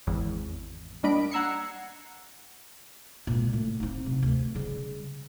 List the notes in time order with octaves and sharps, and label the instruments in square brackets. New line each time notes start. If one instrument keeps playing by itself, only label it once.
[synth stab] G#1 E2
G3 A#3 D4 D#5 B5 D7
F#5 A#5 E6 G#6 C7 C#7
[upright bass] A#2 G#3
A2
C4 D#4
F#2 C3
D2
C#3 G3